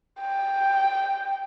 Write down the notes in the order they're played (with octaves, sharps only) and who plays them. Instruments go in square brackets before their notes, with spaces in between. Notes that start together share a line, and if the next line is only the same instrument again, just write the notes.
[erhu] G5